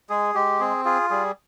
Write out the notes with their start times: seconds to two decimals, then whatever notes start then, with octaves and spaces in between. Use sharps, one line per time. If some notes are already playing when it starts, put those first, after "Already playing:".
0.10 G#3 G#4
0.35 G#3 G4
0.60 C4 G#4
0.85 F4 G#4
1.10 G3 G#4